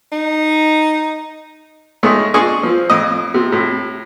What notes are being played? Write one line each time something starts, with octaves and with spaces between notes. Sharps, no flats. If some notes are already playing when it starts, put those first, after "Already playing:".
D#4
D#3 G#3 A3 C#5
D4 G#4 D5 D#5 C6 C#6
F3 C4
F2 A2 D#5
C3
A2 C3